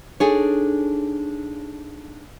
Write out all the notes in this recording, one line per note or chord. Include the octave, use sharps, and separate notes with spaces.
D4 D#4 G#4 A4 C#5